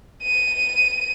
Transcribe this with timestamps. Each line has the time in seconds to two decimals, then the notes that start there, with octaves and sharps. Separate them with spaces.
0.24 D#7